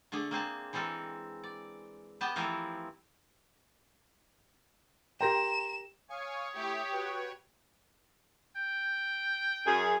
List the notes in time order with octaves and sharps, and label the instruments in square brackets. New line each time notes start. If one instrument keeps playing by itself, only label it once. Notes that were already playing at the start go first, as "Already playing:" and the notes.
[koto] D3 A3 D4 G#4
A#3 C4 G#4 A5
E3 G#3 C4 A4 A#4
D5
B3 G4 D#5 A5
E3 F3 A3 C4 E4 A#4
[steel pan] G4 A#4 G5 [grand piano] A#5 C6 A#6 [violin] E7
[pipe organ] C#5 [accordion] F5 G#5 C#6 [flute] D#6
[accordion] A3 E4 G6 [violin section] G4
[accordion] F#4 B4 G5
[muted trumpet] G5
[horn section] F#2 G#4